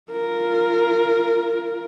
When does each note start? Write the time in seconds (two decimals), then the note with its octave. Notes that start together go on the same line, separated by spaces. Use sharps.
0.12 F4 A#4